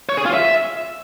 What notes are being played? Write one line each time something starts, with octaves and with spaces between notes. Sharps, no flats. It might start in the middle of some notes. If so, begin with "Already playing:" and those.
C#5
G#4
F4
E5